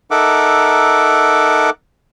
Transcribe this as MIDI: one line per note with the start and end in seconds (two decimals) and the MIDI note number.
0.11 1.70 63
0.11 1.70 69
0.11 1.70 70
0.11 1.70 76
0.11 1.70 78
0.11 1.70 86